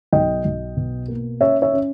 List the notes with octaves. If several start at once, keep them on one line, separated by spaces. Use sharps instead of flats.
B1 D#5 G5
B1
B2
A#3
C#4 C#5 E5
C#5 E5
C#4